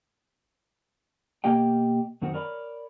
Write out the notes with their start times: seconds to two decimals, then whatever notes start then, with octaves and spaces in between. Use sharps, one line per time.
1.44 B2 A#3 G4 D#5 G5
2.22 F#2 D#3 C4 F#4
2.34 A#4 C#5 D5 B5